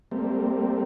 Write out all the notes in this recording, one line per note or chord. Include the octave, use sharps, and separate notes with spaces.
G3 A3 A#3 C4